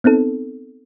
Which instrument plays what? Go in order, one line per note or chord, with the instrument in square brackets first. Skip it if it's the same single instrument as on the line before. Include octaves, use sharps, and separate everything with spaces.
[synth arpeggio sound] B3 C4 D#4 A4